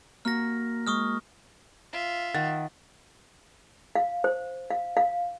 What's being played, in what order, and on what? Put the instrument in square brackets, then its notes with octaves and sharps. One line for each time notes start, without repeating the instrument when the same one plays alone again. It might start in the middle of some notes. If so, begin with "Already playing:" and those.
[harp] A#3 F#4 [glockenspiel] F6 A#6
[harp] G#3 [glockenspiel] C#6 D#6 F6
[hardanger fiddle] F4 E5
[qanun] D#3 [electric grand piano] F#5 A6
[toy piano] F5
C5
F5
F5